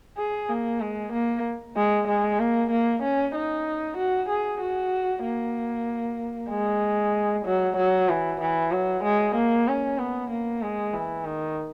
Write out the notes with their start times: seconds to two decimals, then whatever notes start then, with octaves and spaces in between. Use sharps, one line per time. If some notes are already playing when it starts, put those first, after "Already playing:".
0.17 G#4
0.49 A#3
0.81 G#3
1.13 A#3
1.76 G#3
2.08 G#3
2.39 A#3
2.70 A#3
3.02 C#4
3.35 D#4
3.97 F#4
4.29 G#4
4.61 F#4
5.24 A#3
6.50 G#3
7.46 F#3
7.77 F#3
8.08 E3
8.41 E3
8.72 F#3
9.04 G#3
9.35 A#3
9.67 C#4
9.99 B3
10.30 A#3
10.62 G#3
10.94 E3
11.25 D#3